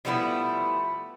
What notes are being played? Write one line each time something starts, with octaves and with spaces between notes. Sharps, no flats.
F3 G3 A3 B3 E4